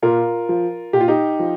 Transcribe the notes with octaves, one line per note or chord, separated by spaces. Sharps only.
A#2 F4 A#4
F3
A#2 G4
F4
D#4 G4
F3